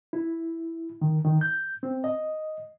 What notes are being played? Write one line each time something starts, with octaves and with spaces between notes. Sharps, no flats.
E4
D#3
D#3
G6
C4
D#5